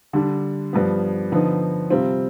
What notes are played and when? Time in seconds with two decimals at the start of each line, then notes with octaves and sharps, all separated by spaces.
0.13 D3 G3 D4
0.73 G2 F3 B3
1.32 D3 F3 B3 D#4
1.90 C3 G3 C4 F4